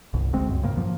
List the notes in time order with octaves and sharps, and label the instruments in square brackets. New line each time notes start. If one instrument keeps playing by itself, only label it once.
[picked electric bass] G1 C2
D2 G#3 C4
C#2 F#2
G#2 C#3 A#3
F#2 F3 A#3